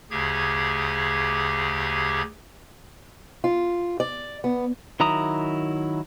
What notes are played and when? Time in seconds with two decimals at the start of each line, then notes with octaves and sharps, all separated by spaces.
0.11 D2 C#3 G4 G#4 G#6
3.44 F4
4.00 D5
4.44 B3
5.00 D#3 F#3 E4 A#5 D#6